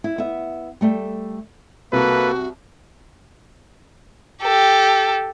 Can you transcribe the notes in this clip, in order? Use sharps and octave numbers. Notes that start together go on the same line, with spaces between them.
E4
B3 E5
G3 A3 E5 G5
C2 A#3 F#4 A4 B4
G4 A4